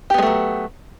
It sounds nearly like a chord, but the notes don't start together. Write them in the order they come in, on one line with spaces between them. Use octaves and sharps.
G4 B3 G#3 A3 F#3